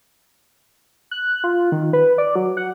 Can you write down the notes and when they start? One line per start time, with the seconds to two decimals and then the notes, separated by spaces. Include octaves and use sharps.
1.11 F#6
1.44 F4
1.72 D#3
1.93 B4
2.18 D5
2.35 F#3
2.57 F#5